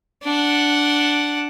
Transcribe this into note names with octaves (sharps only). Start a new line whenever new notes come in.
D4 F#5